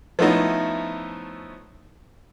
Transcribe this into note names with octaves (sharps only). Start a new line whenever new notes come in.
F3 A3 B3 C#4 D#4 E4